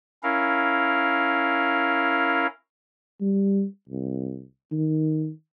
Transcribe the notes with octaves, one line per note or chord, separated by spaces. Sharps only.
C#4 E4 A#4 F5
G3
C2
D#3